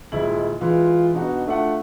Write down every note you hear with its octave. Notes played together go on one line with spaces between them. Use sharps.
D#1 G#3 E4 F#7
E3 G#3 F4
B2 D4 D#4 F#4
A3 D4 F4 F#5